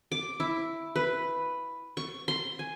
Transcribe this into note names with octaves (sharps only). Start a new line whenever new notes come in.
D6
E4
B4
C#6
C6
G#5